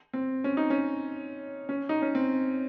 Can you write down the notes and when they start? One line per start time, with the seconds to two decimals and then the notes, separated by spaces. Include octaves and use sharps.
0.13 C4
0.44 C#4
0.57 D#4
0.70 C#4
1.69 C#4
1.89 D#4
2.02 C#4
2.15 C4